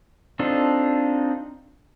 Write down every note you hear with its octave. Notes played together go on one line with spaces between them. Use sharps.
C4 D4 D#4 F4 A4